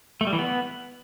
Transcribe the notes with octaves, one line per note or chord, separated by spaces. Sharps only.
A3
G3
E3
B3